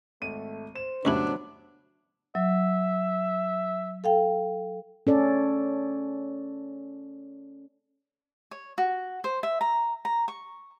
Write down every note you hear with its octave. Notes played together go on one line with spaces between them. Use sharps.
G#1 A3 D#7
C5 E7
C#2 A2 F#3 G3 B3 D4 E4
F#3 E5
A4 F5 G5
C#4 A4 D5
C#5
F#4
C5
E5
A#5
A#5
C#6